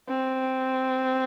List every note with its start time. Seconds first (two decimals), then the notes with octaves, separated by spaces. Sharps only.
0.09 C4